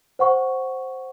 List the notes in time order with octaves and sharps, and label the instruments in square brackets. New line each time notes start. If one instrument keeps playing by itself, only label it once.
[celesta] C5 F#5 C#6